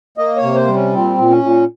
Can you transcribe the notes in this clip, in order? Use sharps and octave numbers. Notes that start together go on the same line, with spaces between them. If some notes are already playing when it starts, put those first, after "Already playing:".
A#3 D#5
C#5
C3
C5
G3
C#4
A#2 C4
A#2
C#4
A#2